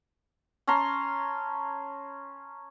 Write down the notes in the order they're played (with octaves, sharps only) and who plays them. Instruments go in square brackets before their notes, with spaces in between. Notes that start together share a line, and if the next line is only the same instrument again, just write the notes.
[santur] C#4 A5 A#5 C6